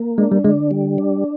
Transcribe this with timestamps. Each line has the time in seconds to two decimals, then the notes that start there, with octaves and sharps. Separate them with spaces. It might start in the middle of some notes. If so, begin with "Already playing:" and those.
Already playing: A#3
0.18 G#3 D4
0.32 G3
0.44 D3 G#3
0.71 G3
0.98 D4